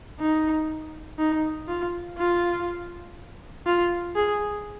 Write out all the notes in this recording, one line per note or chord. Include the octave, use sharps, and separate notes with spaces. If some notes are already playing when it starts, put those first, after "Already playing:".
D#4
D#4
F4
F4
F4
G#4